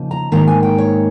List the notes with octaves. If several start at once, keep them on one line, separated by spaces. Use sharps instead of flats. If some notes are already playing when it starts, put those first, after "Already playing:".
Already playing: C#3 F3 A#3 D#4
A#5
G#2 D#3 A#3 A#5
G#5
G5
C#5